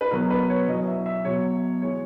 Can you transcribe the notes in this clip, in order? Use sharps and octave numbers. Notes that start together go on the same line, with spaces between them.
B4
B2 F#3 A#4
B4
C#5
E2 B2 F#3 D#5
E5
E5
B2 F#3 C#5
E3 G#3 C#5